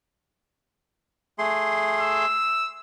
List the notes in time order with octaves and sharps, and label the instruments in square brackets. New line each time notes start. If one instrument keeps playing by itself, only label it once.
[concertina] A3 G#4 C6
[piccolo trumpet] E6